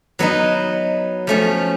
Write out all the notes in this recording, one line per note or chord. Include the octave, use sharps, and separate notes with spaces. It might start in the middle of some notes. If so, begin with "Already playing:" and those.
F#3 B3 D#4
F3 A3 C#4